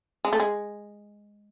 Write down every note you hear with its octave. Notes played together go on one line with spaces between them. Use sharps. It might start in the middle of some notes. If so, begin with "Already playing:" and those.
G#3
A3
G#3